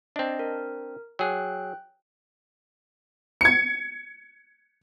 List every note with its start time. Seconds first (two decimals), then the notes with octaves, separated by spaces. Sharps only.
0.16 C4 D4 D#5 A5
0.39 A#4
1.19 F#3 G#4 G5 F#6
3.41 G#6 C#7